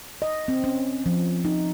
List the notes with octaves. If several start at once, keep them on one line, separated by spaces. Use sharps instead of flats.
D#5
C4
C#4
F3
D#4